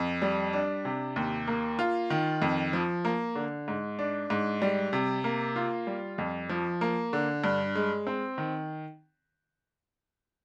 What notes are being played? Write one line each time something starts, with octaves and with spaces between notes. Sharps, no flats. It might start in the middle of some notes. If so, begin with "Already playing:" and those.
Already playing: F2
G3
D4
C3
D#2
A#3
F4
D#3
F2
F3
A#3
D3
G#2
D4
G#2
G3
C3
A#3
F4
G3
F2
F3
A#3
D3
G2
G#3
C4
D#3